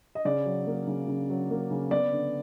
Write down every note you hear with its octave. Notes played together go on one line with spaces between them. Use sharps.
D#5
C#3 D5
F#3
A#3
C#3
C#3
F#3
A#3
C#3
B3 D5
D3